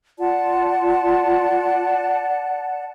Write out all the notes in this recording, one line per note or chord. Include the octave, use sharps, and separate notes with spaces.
F4 D5 F#5 A5